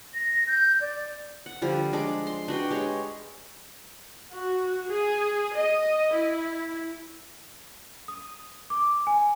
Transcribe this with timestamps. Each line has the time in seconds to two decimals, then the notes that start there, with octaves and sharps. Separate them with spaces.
0.14 A#6
0.47 G6
0.81 D5
1.46 F#5
1.62 D3 F3 G3
1.93 G#3 D4 D5 D6
2.27 C6
2.48 D4 F#4 B4 G5
2.71 G#3 G4 C#5
4.33 F#4
4.90 G#4
5.57 D#5
6.14 E4
8.08 D#6
8.70 D6
9.07 G#5